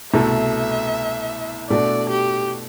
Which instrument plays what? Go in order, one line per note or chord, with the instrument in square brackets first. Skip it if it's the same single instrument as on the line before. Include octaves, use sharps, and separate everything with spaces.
[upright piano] C2 B2 A3 [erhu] E5
[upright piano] B2 A3 D4 F#4 A4 [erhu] D5
[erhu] G4